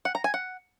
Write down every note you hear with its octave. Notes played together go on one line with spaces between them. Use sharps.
F#5
A#5
G#5
F#5